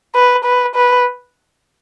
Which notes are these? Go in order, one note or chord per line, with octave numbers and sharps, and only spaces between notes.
B4
B4
B4